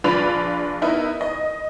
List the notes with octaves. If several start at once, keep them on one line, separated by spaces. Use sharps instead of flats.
A#1 D4 F4 B4 B5 F7
B3 D#4 E4 A#4
D#5